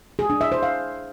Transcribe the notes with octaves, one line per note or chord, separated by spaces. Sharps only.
G#4
D4
E5
C5
F5